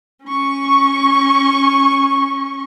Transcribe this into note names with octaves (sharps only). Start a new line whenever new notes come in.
C#4 C#6